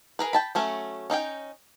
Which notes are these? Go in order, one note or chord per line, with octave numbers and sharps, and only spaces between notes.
G#4 A#4 B4
G5 A5 B5
F#3 A3 C#4
C#4 D#4 F4 G5